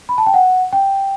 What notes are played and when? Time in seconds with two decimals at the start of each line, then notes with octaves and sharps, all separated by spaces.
0.09 B5
0.18 A5
0.27 G5
0.34 F#5
0.73 G5